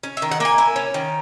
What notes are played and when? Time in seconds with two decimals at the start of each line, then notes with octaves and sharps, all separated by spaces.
0.03 C#4
0.17 E5
0.22 D#3
0.31 F#5
0.40 A#3 G#5
0.58 E4
0.76 C#4
0.94 D#3